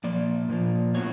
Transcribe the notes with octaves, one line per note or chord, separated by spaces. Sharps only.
A#2 F3 A#3 D5
A#2 F3 A#3
A2 F#3 B3 C#5